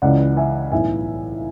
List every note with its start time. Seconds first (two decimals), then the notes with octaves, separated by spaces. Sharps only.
0.02 C#2 C#3 E3 D5 F#5
0.37 E5 G#5
0.72 B1 A2 E3 E5 G#5